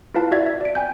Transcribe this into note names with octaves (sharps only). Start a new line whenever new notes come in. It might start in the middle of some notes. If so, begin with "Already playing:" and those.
E4 F4 B4 F5 A5
F#4 D5 E5 G#6 A6
E5
D5 D7
G5 G#5 G6